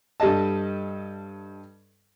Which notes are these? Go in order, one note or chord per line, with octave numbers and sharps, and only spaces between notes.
G2 G3 A4 D#5 A5